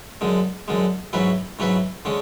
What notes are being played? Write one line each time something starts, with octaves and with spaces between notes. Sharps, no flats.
F#2 D3 G#3
F#2 D3 G#3
G#2 F#3 C#4 E4 B4
G#2 F#3 C#4 E4 B4
D3 G#3 C#4